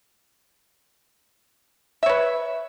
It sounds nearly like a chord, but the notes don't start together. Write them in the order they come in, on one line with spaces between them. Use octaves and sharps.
E5 C#5 B4